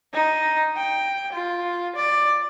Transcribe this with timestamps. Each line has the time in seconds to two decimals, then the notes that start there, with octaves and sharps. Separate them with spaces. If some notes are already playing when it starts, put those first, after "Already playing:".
0.14 D#4
0.77 G5
1.33 F4
1.96 D5